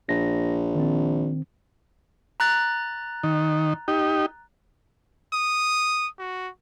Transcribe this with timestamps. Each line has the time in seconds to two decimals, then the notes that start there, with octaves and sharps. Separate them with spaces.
0.09 A#1 A#6
0.75 D#3 C4
2.40 A#5 F#6 A6
3.23 D#3
3.88 D#4 G4
5.33 D#6
6.18 F#4